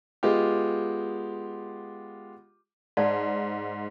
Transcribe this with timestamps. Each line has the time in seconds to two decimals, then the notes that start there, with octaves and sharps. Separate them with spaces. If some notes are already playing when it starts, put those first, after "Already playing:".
0.23 G#3 B3 F4 G4
2.97 G#2 D5 A5